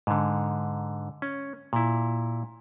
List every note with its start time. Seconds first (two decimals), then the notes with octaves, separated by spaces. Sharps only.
0.07 G#2 D3
1.22 C#4
1.73 A#2 E4